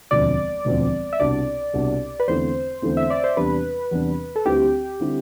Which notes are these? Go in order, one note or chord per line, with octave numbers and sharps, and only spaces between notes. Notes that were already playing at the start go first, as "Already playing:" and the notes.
E1 D2 D3 F3 C4 D5
E1 D2 D3 F3 C4
E5
C2 B2 B3 D4 D5
C2 B2 B3 D4
B4
E2 D3 A3 C4 E4 C5
E2 D3 A3 C4 E4
E5
D5
C5
E2 C3 G3 D4 B4
E2 C3 G3 D4
A4
D2 D3 G3 C4 E4 G4
D3 G3 C4 E4